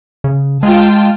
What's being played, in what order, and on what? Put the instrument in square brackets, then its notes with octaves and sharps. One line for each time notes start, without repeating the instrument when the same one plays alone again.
[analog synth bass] C#3
[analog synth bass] G#3 [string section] F4 G5 A5